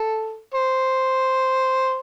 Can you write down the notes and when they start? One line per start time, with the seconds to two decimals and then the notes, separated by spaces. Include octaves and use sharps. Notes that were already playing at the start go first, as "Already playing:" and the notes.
Already playing: A4
0.55 C5